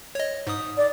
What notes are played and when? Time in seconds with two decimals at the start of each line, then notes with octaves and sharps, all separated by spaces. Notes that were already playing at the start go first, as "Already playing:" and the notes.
0.15 C#5 D#5
0.47 G#2 D#6
0.77 D5